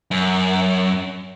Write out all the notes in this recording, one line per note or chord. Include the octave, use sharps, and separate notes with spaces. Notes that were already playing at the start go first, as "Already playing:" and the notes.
F#2